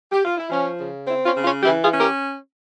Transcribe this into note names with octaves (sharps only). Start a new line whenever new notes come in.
G4
F4
E4
F3 C#4
C#3
C4 E4
C#4 F4
C#3
C#4 F4
E3 E4 G4
F4 G#4
C#4
G4 A#4